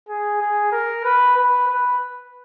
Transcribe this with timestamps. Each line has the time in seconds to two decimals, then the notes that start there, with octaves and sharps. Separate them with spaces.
0.09 G#4
0.41 G#4
0.72 A#4
1.04 B4
1.36 B4
1.68 B4